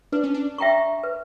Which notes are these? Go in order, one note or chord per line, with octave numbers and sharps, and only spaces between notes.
D4 B4
C#4
D4
E5 G5 A#5 C#6
B4